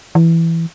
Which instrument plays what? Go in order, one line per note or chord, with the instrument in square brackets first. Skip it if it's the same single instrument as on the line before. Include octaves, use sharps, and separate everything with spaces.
[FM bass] E3